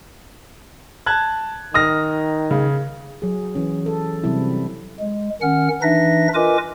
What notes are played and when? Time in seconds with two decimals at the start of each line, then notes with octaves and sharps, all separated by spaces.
1.06 A5 F#6 G#6
1.74 D#3 D#6 F6 A#6
2.51 C#3
3.22 F#3 G#4
3.55 E3 C#4
3.86 A4
4.24 C3 F#3 G3 C4 E4
5.00 G#3
5.42 D#3 C#4 F#5 F6
5.82 E3 D4 D#4 B4 E5 A#6
6.34 F4 A#4 B4 D#5 G#5 D6